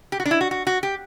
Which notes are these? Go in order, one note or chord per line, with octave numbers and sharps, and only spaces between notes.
G4
F#4
D4
E4
F#4
F#4
F#4
G4